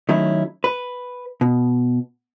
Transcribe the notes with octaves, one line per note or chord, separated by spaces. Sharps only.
D#3 F#3 A3 C#4 E4
B4
B2